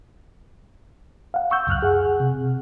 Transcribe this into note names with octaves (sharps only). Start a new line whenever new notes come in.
F5 F#5
C#6 E6 G6
C#2 F#2 F6 F#6
G#4 F#5
C3